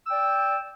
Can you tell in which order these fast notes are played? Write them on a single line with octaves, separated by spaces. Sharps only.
E6 G5 D5